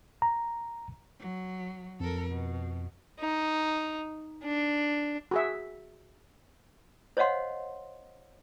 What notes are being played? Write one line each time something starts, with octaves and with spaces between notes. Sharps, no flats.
A#5
F#3
F2 A4 A#4
B2
D#4
D4
F#4 G#4 E5
C5 C#5 D#5 F5 F#5 C6